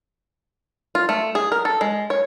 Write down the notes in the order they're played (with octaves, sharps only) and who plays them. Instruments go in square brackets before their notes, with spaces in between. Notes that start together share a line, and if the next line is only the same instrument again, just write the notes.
[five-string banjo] F4
A3
G#4
A#4
A4
G#3
C#5